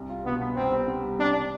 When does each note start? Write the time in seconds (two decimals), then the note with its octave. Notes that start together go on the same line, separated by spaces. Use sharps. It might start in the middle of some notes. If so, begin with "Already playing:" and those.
Already playing: C2
0.09 F4
0.25 B2 B3
0.41 B3
0.56 C2 C4
0.72 B3
0.87 C3
1.04 G3
1.19 C3 D4
1.35 C3